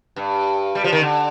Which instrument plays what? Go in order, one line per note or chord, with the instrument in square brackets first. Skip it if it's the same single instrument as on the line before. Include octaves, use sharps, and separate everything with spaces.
[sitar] G2
G3
F3
D#3
D3